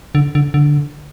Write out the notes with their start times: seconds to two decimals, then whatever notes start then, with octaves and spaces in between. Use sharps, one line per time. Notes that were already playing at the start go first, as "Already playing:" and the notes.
0.15 D3
0.35 D3
0.54 D3